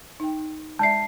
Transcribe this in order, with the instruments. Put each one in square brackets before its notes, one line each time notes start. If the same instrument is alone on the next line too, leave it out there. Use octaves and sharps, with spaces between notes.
[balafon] D#4 G5
[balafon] G#3 D5 E5 [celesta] A5 C7